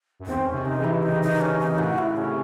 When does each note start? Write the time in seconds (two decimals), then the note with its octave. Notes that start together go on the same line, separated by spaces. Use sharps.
0.19 F#2
0.26 E2 G#2 C4
0.45 C#4
0.52 C3 D#3
0.65 D#4
0.77 C#3 E3
0.84 E4
1.02 D#4
1.22 D#4
1.41 C#4
1.59 D#4
1.78 A2 C#3 F#4
1.98 E4
2.17 C3 C#4
2.28 C#3